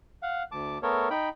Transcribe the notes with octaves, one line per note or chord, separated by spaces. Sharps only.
F5 F#5
D2 A5 D6
A3 B3 A4 A#4 C#5
D#4 G5 B5